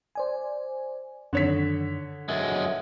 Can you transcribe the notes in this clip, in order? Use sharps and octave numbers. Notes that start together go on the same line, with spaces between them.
C5 D5 G#5
F#2 D3 D#3 C#5 B6
F#2 G#3 E5